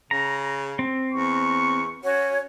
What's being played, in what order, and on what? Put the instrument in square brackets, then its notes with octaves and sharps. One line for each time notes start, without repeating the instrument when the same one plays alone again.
[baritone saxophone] C#3 [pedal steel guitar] A#5
[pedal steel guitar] C4
[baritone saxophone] E2 [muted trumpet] C#6
[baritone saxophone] C#4 [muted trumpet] F#4 [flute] C#5